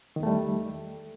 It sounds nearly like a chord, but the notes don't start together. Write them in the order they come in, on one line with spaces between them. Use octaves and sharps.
D#3 E2 A3 G3